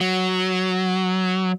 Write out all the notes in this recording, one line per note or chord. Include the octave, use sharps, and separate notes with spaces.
F#3